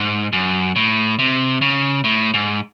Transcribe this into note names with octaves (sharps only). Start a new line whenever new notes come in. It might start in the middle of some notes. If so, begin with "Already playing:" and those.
Already playing: G#2
F#2
A2
C3
C#3
A2
G#2